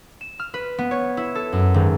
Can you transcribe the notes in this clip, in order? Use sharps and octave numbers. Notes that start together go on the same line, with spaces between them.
E7
F6
B4
B3
C#5
E4
A4
F#2
G#1